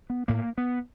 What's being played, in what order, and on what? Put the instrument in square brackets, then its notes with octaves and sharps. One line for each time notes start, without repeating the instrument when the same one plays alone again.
[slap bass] B3
A2 A#3
B3